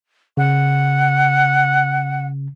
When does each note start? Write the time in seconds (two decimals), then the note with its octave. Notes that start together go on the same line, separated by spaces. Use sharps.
0.37 C#3 F#5